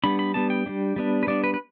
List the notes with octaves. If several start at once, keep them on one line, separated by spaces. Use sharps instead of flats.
G3 B3 D4 B5
B5
G3 B3 D4 A5
G5
G3 B3 D4
G3 B3 D4
B4
G3 B3 D4 D5
B4
B4